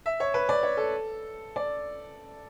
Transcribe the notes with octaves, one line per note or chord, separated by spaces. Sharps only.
E5
C#5
B4
D5
C#5
A4
D5